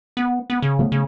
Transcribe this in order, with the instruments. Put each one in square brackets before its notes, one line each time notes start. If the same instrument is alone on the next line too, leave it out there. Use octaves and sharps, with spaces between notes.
[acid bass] B3
B3
C#3
[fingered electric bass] F3 A3 B3
[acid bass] C#3